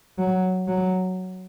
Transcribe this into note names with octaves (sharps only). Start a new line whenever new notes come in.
F#3
F#3